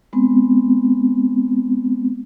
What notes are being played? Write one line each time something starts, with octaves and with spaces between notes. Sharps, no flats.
G#3 B3 C4